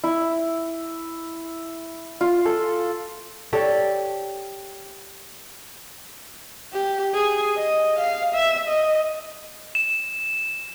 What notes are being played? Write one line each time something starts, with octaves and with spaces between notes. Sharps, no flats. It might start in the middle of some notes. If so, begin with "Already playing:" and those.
E4
F4
A4
G4 A4 C#5 D5
G4
G#4
D#5
F5
E5
D#5
E7